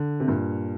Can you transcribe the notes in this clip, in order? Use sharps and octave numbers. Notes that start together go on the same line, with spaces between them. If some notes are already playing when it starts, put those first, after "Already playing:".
Already playing: D3
C3
G2 A#2